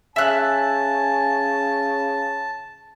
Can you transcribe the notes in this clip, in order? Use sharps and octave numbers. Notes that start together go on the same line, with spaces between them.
C#3 E5 G#5 A5 F#6